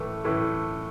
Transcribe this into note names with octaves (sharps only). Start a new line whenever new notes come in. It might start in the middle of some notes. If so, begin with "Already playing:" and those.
Already playing: A2 E3 A3
A2 E3 A3